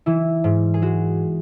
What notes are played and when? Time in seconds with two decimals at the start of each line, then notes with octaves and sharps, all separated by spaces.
0.06 E3 E4
0.44 G#2
0.74 G#4
0.82 G#3 F#4